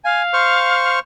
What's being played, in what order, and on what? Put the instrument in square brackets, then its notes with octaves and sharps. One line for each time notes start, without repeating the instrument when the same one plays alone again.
[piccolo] F5 [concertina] G#5
[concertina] C5 C#6 F6